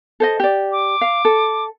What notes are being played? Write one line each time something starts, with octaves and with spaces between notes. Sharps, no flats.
A4 C5 D#5
G4 D5
D6
F5
A4